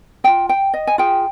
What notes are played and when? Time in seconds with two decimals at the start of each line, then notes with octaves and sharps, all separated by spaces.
0.24 F4 G#4 G5
0.49 G5
0.74 D#5
0.87 G#5
0.98 F4 G#4 G5